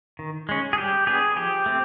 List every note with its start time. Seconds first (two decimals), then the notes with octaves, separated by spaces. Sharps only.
0.19 D#3
0.49 G#3 C#4
0.73 G#4
0.78 G3 G4
1.07 B3 D4 G#4
1.36 F3 G4
1.66 A3 C4